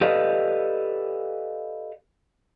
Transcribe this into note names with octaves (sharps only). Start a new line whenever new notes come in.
G4 A4 B4 D5 D#5 F5